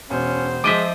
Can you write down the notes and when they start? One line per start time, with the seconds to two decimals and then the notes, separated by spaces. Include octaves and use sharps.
0.10 E1 C#4 C5
0.64 F3 G#3 D#5 E5 D6 D7 D#7